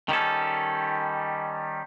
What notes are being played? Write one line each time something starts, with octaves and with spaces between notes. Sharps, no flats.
D#3 G3 C#4 A4